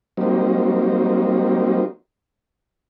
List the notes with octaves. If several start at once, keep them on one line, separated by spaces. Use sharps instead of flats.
F#3 G3 A#3 C4 D#4